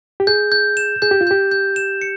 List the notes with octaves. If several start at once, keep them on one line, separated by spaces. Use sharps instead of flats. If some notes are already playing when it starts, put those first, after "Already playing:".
G4
G#4 G6
G6
E7
G#4 G6
G4
F4
G4 G6
G6
E7
C#7